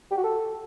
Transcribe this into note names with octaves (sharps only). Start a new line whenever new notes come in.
G4
F#4
A4